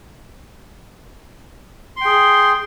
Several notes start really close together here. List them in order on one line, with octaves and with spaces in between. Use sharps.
C6 G5 G#4